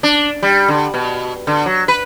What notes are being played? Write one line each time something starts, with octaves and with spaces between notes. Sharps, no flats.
D4
G3
D3
B2
D3
F#3
B4